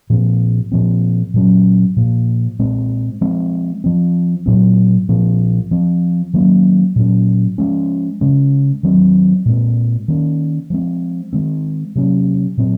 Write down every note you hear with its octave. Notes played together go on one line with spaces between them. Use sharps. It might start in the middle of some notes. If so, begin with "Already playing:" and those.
A#2 F3 C4
A#2 F3 C4
A#2 F#3 C#4
A#2 F3 A#3
A#2 G#3 C4
F3 G#3 C4
F3 C4
A#2 F#3 C4
A#2 F3 C4
F3 C4
D#3 F#3 A#3 C#4
A#2 F#3 C#4
F3 G#3 C#4
C#3 G#3 C#4
D#3 F#3 C4
A#2 G#3 C4
D#3 A#3 C#4
F3 G#3 C4
D#3 G#3 C4
C3 F#3 A#3 C#4
A#2 F#3 C4